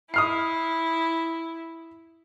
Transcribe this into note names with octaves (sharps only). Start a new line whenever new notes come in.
E4 D#6 F6 C7